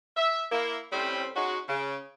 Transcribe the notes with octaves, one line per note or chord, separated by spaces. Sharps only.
E5
A#3 E4
A2 G3 C4 C#4 C5 B5
G#3 C#4 D#4 F#4
C#3